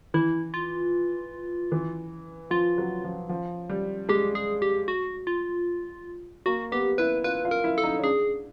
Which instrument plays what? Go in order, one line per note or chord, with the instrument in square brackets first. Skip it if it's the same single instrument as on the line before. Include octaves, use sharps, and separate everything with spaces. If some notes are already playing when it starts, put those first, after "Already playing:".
[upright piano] E3 [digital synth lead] E4
[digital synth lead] F4
[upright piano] E3
[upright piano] F3 [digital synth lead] F4
[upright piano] F#3
F3
F3
G3
[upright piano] G#3 [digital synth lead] G4
[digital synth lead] G#4
G4
F#4
F4
[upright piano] A#3 [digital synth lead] F#4
[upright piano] B3 [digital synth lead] G4
[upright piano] E4 [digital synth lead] B4
[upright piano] F4 [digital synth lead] B4
[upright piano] F4
[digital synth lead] A#4
[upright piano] E4
[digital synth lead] A4
[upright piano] D#4
C#4
[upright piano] D4 [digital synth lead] G#4